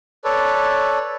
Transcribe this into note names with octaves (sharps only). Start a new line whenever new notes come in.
A4 B4 C#5 D5